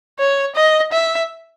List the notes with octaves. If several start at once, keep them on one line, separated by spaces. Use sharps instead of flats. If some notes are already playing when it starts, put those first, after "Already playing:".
C#5
D#5
E5